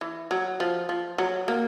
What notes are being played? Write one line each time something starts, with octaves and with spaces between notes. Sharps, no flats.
E3
F#3
F3
F3
F#3
A#3